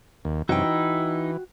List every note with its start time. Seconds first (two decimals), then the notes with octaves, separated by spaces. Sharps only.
0.25 D#2
0.49 F#2 C3 E3 D#4 E4 F#4 G5
0.64 E3